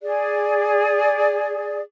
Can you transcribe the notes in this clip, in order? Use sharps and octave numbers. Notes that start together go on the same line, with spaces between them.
G#4 D5